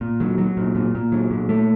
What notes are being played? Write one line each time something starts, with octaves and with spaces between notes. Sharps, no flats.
A#2
F#3
F#3
A#2
A#2
A#2
F#3
A#2
A3